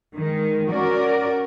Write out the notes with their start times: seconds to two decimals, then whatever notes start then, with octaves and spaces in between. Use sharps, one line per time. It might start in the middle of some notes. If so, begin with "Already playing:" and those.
0.16 D#3 G#3
0.70 C#4 F#4 A#4 D5